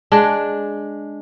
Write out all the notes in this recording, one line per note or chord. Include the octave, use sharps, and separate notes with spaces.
G#3 D4